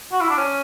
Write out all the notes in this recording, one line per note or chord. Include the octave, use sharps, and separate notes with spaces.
F#4
E4
D4
C#4